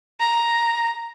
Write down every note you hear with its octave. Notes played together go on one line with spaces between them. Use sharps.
A#5